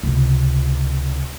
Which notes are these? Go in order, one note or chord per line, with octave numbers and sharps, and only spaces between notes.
C#2 C3